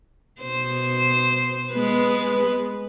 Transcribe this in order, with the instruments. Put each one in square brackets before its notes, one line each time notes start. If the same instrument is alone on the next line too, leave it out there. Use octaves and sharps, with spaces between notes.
[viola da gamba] B2 C5
G#3 B3 B4